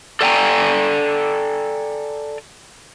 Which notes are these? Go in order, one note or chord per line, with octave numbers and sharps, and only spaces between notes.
A4 D5 G5 G#5 A#5